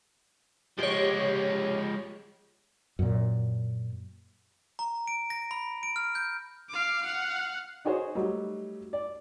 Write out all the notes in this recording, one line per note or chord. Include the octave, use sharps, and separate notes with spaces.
F3 G#3 G4 C#5
F#2 A#2
A#5
D7
A#6
B5
D7
F6
G6
F5 D6
F5 F#5
D#4 F#4 G#4 C5 C#5
F#3 G3 A3 D#4
D5